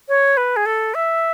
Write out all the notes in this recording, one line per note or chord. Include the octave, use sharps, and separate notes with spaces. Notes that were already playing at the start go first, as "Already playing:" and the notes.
C#5
B4
G#4
A4
E5